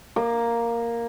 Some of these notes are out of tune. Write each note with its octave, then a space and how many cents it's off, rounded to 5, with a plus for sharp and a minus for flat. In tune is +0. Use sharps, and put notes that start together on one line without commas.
A#3 +0 D6 +35